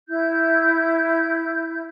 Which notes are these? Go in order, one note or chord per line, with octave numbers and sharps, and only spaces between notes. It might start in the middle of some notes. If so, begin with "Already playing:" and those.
E4 G6